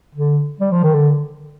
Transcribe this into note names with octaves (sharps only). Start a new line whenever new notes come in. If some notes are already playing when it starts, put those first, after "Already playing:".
D3
G3
F3
D#3
D3